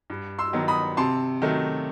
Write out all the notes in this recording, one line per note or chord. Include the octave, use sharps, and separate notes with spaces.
G2
C6 E6
D#3 F#3 B3
B5 D#6
C3 A5 C6
D#3 F#3 A3